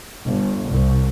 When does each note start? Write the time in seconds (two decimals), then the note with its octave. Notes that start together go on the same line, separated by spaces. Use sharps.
0.25 G1
0.69 C2